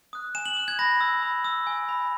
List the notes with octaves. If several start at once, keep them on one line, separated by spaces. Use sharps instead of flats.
D#6 F#6
G#5 E7
F#7
D#6 F#6
G#6
B5 A#6
E6
B5
E6
G#5
B5 E6